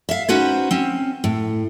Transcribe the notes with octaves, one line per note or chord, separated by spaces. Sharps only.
E5 F5
C#4 D#4 F#4 B4 C5
C4 C#4
A2